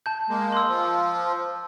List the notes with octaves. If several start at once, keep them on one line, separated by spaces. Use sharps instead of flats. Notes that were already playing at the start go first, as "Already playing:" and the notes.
A5 G6
G#3 A#3
C6 E6
F3